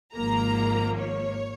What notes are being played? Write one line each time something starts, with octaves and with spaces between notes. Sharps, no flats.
G#1 G#2 F3 A#3 A#5
C#5